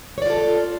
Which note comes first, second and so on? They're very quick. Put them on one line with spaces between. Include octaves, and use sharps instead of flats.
C#5 D5 F4 A4